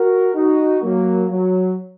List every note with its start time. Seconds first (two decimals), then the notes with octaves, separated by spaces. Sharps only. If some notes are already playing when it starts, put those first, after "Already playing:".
Already playing: F#4 A#4
0.35 D#4 F#4
0.82 F#3 A#3
1.30 F#3